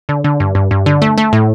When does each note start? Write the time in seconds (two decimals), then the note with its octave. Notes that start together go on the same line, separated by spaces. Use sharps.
0.09 D3
0.24 D3
0.40 G2
0.55 G2
0.71 G2
0.86 D3
1.02 A3
1.18 A3
1.33 A2